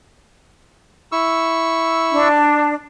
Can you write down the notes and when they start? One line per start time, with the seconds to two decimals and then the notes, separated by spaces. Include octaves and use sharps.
1.12 E4 C#6 E6
2.12 D4